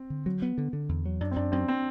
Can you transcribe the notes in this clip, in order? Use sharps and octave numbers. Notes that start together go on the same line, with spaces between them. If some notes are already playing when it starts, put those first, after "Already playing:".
Already playing: C4
D3
F#3
B3
D3
D3
E2
F#3
F#2 D4
C4
F#2 D4
F#2 C4
C4